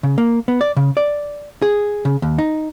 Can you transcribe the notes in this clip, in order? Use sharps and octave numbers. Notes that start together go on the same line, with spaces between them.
C#3
A#3
B3
D5
C#3
D5
G#4
C#3
D#2
D#4